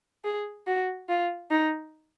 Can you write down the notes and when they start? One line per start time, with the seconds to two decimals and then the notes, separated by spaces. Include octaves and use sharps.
0.24 G#4
0.67 F#4
1.09 F4
1.51 D#4